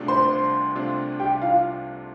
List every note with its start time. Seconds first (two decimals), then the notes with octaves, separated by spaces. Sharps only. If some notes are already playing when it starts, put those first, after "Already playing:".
Already playing: C2 C3 A3 D4 F4
0.08 C5 C6
0.31 C2
0.75 C3 A3 D4 F4
1.20 C2 G4 G5
1.42 F4 F5